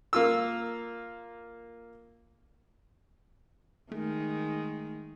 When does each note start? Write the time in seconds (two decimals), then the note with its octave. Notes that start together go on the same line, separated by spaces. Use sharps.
0.13 A#3 F4 E6
3.92 D#3 G#3 A3